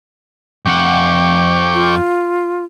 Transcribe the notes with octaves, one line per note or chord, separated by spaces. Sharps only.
F2 F#5 G5 C#6 D6
F4